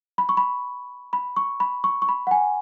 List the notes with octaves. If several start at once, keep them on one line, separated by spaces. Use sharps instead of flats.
B5
C#6
B5
B5
C#6
B5
C#6
C#6
B5
F#5
G#5